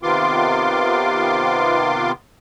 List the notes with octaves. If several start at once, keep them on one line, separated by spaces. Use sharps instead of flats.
C3 D#3 B3 F4 C6 D6